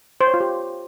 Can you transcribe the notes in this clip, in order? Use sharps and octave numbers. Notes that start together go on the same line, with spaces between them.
C5
C#5
F4
G4